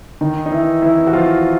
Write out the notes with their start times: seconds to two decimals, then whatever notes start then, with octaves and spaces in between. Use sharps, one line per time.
0.21 D#3 D#4
0.46 D#4
0.51 E3 E4
0.82 E3 E4
1.07 F#4
1.13 F3 F4